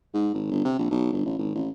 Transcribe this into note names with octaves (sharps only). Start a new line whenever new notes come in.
G#2
G#1
G1
C3
A#1
B1
G1
A1
G#1
A1